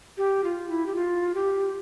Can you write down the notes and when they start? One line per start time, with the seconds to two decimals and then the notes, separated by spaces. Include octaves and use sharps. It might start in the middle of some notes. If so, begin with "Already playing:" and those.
0.17 G4
0.44 F4
0.69 E4
0.86 G4
0.95 F4
1.34 G4